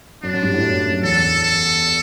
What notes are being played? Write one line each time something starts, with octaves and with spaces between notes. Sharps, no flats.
F#2 D4
F#2
G2
A2
F#2
F#2
E2 A4
A4